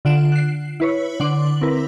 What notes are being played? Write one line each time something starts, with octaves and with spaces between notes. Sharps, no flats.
D3 F4 F#5 D7 E7
F#6 C7
E4 B4 C#5
D3 F#5 C6 D6 F#7
C4 E4 A#4 B4